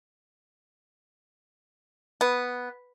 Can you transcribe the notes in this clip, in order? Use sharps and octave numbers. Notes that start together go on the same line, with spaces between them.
B3